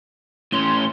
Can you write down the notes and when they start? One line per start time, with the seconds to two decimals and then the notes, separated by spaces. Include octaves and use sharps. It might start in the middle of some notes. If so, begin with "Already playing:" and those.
0.52 A2 C#4 C6